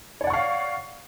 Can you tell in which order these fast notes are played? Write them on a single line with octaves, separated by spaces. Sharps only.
C#5 D5 F#5 C#6 F5